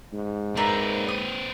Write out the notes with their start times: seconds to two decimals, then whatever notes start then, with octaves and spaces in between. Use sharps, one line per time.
0.13 G#2
0.57 C4 A#4 B4 D5 E5
1.09 D#6